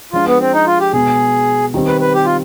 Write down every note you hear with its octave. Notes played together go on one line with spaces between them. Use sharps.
F3 G#3 D4 F4
B3
C4
D#4
F4
G4
B2 G#3 B3 G#4
D#3 G3 C4
B4
B4
G4
F4